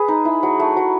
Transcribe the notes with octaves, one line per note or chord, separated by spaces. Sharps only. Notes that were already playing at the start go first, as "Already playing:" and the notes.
Already playing: G#4 B4
D#4
E4
F#3
A3
F#3